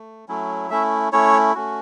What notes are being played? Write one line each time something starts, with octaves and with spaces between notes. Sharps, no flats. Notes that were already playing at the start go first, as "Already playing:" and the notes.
Already playing: A3
F#3 A3 C#4 E4
A3 C#4 E4 E5
A3 C#4 E4 C#5
A3 C#4 F#4